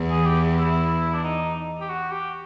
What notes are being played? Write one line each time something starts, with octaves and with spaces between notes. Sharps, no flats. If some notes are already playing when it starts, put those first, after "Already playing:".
Already playing: E2
G#4
G4
E4
D4
D#4
G4
F#4
G4